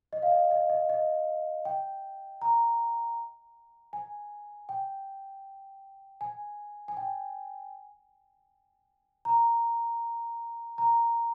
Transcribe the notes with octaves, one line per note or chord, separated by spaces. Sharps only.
D#5
F5
D#5
D#5
D#5
D#5
G5
A#5
G#5
G5
G#5
G#5
G5
A#5
A#5